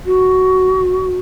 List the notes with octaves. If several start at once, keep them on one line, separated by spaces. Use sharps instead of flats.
F#4